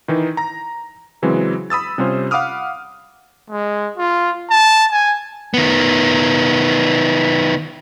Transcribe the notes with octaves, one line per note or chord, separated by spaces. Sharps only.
D#3 E3 D#4
A#5 A#6
C#3 E3 F#3 G#3 C4
B5 D#6 E6 A6
C3 G3 C#4 F4 C5
F5 F#5 B5 D6 D#6 F6
G#3
F4
A5
G#5
D#3 B3